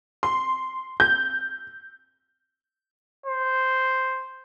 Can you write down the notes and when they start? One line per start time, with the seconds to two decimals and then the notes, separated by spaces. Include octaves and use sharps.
0.23 C6
1.00 G6
3.26 C5